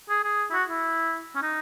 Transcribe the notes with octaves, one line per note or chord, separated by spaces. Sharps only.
G#4
G#4
E4
F#4
E4
C#4
D#4